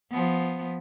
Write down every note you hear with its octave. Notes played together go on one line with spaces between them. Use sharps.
F3 B3